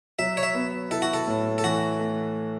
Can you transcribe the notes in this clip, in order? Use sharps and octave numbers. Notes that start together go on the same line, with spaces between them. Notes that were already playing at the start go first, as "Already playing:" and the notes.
F#3 E5
C#5
E5
B3
E4 A4
F#4
A4
A2
A4
E3 F#4
A3